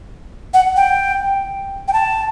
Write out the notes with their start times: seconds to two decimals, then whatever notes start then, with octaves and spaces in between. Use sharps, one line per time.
0.54 F#5
0.76 G5
1.88 G5
1.93 A5